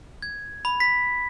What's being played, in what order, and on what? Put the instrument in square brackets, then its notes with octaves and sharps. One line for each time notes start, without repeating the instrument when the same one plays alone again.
[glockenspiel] G#6
B5
B6